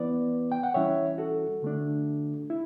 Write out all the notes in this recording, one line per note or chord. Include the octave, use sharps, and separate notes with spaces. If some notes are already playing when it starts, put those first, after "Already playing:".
Already playing: E3 B3 E4 B4 D5
G5
F#5
E3 G3 C#4 E4 C#5 E5
F#4 A4
D3 A3 D4
E4